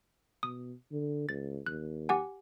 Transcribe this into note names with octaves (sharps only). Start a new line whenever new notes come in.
B2 D#6
D3
C#2 A6
D#2 F#6
G4 F#5 G#5